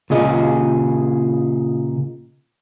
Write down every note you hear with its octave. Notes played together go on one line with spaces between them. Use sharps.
A#2 C#3 G#4 D#5